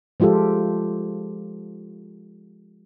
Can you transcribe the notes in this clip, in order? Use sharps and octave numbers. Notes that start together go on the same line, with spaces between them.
F3 G#3 F4 G4 A4